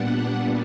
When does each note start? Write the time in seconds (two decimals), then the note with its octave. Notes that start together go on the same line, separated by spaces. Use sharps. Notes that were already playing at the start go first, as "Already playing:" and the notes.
Already playing: A#2 G3 B3 D4 F#5